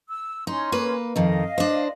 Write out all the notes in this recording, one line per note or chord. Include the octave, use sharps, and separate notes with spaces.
E6
C#4 D#4 C6
A#3 B4
F2 D#3 D#5 F5
D4 C5